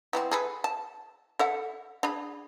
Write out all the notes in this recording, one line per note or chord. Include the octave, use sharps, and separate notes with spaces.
E3 B3 C4
G#4 A4 B4
A5
A4 E5 F#5
D4 G#4 B5